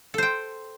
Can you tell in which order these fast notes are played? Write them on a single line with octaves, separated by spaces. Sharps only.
A4 C5 G5